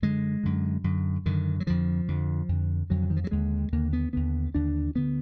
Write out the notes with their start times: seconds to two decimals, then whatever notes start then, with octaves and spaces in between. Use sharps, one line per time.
0.02 F#2 D3 G#3
0.44 F#2 D3
0.84 F#2 D3
1.26 F#2 D3 D#3
1.60 F#3
1.67 F2 D3 F3
2.08 F2 D3
2.49 F2 D3
2.90 F2 D3 F#3
3.02 D3
3.10 D#3
3.17 F3
3.24 F#3
3.31 D#2 D3 G#3
3.72 D#2 D3 A#3
3.93 B3
4.13 D#2 D3 B3
4.55 D#2 D3 D4
4.95 D2 D3 B3